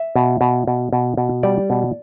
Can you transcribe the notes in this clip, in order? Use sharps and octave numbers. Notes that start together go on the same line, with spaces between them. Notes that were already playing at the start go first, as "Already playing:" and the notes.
Already playing: E5
B2
B2
B2
B2
B2
G3 D5
B2